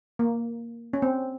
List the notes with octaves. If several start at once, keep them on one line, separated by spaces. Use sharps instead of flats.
A#3
C#4
C4